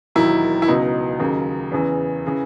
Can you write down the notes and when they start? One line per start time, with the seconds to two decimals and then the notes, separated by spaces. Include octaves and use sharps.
0.15 E1 D#2 D#3 F#3 E4
0.62 E4
0.68 C#2 B2 F#3 D#4
1.20 D#2 C#3 F#3
1.72 E2 C#3 E3
2.27 C#3 E3